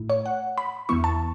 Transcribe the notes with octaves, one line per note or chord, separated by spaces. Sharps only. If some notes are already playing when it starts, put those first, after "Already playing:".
Already playing: A2 A3 E4
C#5
F#5
B5
E2 E3 B3 E4 C#6
A5